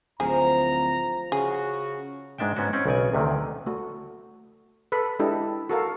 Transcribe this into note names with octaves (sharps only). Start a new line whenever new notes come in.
D1 F3 G#4 A#5
C#3 F#4 G#4
G#2 G#3 D4 E5 G5
G#2 B3 C#4 F#4
C4 C#4 F#5
B1 C#3 D5 G#5
D2 C3 D#3
A3 F#4
A4 B4 B5
G#3 D4 E4 G4 A4 D#5
F#4 A4 A#4 F5